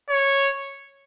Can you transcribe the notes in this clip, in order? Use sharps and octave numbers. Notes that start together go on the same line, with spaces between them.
C#5